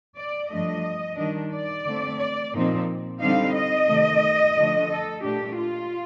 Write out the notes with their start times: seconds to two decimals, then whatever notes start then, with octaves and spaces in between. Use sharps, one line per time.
0.17 D5
0.50 G2 F3 A3 D4 D#5
1.18 D#3 G3 D4
1.52 D5
1.86 D3 A3 C4
2.19 D5
2.54 A#2 F3 C4 D#4
3.20 D3 G3 C4 D#4 F5
3.54 D#5
3.88 C3 D#3 A3
4.56 D3 F3 A3 D4
4.89 A4
5.23 A#2 A3 D4 G4
5.57 F4